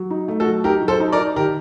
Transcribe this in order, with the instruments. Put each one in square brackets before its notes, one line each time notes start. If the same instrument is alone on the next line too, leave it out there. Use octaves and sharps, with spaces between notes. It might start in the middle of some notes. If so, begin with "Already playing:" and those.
Already playing: [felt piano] F#3
D#4
A3
[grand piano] F#4 A4
[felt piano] F#3
[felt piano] D#4 [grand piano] G4 A#4
[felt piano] F#3
[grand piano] A4 C5
[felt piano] D#4
[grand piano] A#4 D5
[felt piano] D#4
[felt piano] D#3 [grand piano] G4 A#4